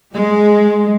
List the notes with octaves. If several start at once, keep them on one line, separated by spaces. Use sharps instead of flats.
G#3